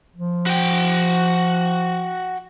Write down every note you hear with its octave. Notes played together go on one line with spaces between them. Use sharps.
F3
F#4 G5